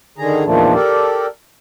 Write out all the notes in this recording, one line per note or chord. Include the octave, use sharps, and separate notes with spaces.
D3 D#3 G#4 A#5
E2 A#2 D#3 F3 A3 D4
G4 A4 A#4 D5